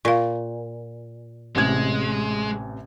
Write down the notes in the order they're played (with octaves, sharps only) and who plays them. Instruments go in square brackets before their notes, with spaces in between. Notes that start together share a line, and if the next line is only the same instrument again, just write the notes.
[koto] A#2 [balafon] F4 F5
[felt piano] A1 C3 G#6 [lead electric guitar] G#3